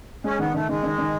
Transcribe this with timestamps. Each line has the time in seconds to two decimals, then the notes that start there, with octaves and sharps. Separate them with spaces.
0.24 G#3 C#4
0.39 D#3 B3
0.54 D#3 A3
0.69 D#3 G#3
0.83 D#3
0.98 D#3